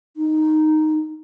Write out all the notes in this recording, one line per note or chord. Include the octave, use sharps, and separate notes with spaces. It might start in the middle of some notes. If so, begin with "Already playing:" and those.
D#4